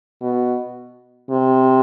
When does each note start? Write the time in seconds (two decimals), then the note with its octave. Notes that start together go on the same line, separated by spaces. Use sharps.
0.22 B2
1.30 C3